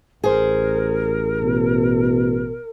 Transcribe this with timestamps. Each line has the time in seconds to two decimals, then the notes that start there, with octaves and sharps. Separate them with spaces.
0.24 A1 G#4 A#4 C5
1.42 B2